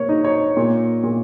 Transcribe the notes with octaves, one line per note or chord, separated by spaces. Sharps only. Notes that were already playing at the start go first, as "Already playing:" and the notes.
Already playing: A#3 C#5
D#4
C#5
A#2
A#2